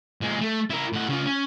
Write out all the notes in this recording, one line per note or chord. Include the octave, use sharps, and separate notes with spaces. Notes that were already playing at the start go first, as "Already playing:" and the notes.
A#2 G#3
A3
E4 A#4
A2 F#5
C#3 F4
C#4